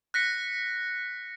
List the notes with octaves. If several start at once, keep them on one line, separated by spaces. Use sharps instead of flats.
F#6 A#6 B6 C#7